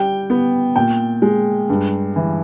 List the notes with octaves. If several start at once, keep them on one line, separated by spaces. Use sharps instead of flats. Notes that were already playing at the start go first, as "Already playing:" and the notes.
Already playing: G3 G5
B3
A#2 G5
G#3
G2
E3